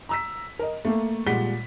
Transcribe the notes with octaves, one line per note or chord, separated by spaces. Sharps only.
A#5 E6 B6
A#4 D#5
A3 A#3
A#2 G3 G#3 F#5 B6 G7